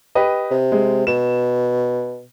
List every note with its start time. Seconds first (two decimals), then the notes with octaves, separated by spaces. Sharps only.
0.15 G4 B4 D#5
0.51 C3
0.72 G#3
1.07 B2 E7